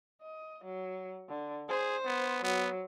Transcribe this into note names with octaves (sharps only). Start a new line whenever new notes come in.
D#5
F#3
D3
G#4 C5
B3
F#3 B3